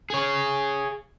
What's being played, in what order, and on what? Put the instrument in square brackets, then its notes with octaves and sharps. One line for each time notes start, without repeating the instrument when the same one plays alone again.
[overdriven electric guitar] G#4 C#5